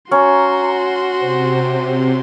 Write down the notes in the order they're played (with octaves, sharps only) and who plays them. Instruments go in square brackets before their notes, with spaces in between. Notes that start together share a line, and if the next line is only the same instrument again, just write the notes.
[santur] C#4 [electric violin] F#4 C6 [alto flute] A#5
[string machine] C3 [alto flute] C5